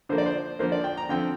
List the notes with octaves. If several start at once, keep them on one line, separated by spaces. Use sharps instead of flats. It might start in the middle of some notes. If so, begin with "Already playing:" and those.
D3 F3 A#3 C5
D5
C5
D3 F3 A#3 C5
D5
G5
A#5
D3 F3 C4 G5